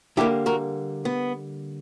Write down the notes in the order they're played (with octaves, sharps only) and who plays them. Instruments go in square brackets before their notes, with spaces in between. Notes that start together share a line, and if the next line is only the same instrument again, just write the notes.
[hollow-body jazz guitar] D3 G3 A#3 E4 G4
F#4 A#4
B3